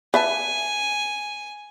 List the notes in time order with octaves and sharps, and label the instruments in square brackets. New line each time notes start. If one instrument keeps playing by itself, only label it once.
[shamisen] B4 E5 A5 [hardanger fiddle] G#5